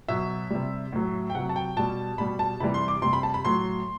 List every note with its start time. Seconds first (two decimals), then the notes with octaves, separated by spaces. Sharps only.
0.08 B2 F#3 E5
0.50 C3 G3
0.93 A2 F#3
1.30 G5
1.35 C3 F#3 F#5
1.49 A5
1.56 G5
1.76 B2 G3 A5
2.18 B2 G3 B5
2.39 A5
2.60 C3 E3 G3 B5
2.74 C6
2.88 D6
3.02 C3 G3 C6
3.13 B5
3.23 A5
3.34 B5
3.45 A2 F#3 C6